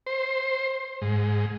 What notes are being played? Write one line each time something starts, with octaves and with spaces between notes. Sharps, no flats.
C5
G#2